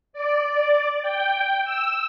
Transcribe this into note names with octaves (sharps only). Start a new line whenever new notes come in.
D5
G5
E6